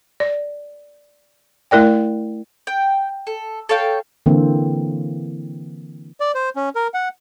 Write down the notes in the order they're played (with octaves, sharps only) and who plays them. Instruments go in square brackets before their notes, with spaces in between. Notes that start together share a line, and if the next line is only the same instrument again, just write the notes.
[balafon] D5
A3 E4 A#4 D5 G5
[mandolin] G5
A4
A4 C#5 F5 G5
[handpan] D3 E3 A#3 C4
[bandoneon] D5
C5
C#4
A#4
F#5